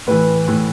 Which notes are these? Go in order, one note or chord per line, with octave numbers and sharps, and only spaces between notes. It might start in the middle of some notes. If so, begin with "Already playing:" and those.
A2 E3 B4
A2 E3